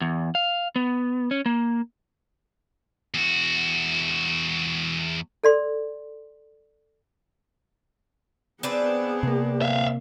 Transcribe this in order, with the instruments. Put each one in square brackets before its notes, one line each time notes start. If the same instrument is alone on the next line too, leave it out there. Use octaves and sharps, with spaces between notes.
[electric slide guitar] E2
F5
B3
C#4
A#3
[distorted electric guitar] E2 F#4
[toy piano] A4 D5 C6
[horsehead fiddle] B3 G#4 [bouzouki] C4 D4 B4
[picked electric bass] C3 A#3
[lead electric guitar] E5 F5